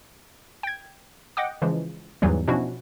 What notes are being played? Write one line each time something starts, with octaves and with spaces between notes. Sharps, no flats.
G5 G#6
D#5 F#5 G5 D6
C#3 E3 F3 G#3
E2 G#2 E3 F#3 G3
B2 F3 C#4 D4 E4 F#4